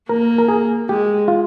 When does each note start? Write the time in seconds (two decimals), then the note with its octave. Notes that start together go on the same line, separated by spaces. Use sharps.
0.09 A#3 A#4
0.38 A#4
0.48 G#4
0.89 G#3 G4
1.28 F4